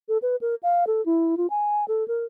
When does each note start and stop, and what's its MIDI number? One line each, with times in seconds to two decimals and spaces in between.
0.08 0.18 69
0.22 0.36 71
0.41 0.55 70
0.63 0.84 77
0.87 1.04 69
1.06 1.35 64
1.37 1.47 65
1.50 1.85 80
1.88 2.06 69
2.08 2.25 70